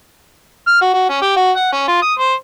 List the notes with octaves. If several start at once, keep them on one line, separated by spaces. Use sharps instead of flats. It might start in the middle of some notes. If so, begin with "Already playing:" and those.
F6
F#4
F#4
C#4
G4
F#4
F#5
C#4
F4
D#6
C5